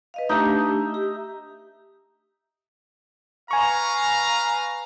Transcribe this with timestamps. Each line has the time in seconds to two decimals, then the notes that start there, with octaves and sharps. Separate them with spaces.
0.14 B4 D#5 F5
0.29 A3 D4 D#4 G4 E5
0.94 G4
3.51 B4 F5 G#5 A#5 C#6